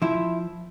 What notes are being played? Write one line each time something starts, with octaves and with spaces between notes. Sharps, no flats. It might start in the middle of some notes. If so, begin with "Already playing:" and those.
F3 E4